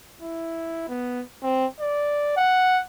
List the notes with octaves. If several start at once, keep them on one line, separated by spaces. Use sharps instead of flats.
E4
B3
C4
D5
F#5